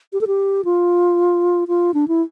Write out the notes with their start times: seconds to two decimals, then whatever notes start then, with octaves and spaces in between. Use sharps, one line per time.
0.13 G4
0.21 A4
0.27 G4
0.65 F4
1.68 F4
1.94 D4
2.08 E4